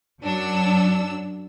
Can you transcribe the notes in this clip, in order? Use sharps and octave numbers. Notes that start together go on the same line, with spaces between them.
F#2 F#3 D4 E6